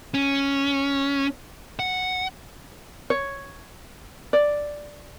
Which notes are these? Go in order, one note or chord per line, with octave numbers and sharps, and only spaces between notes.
C#4
F#5
C#5
D5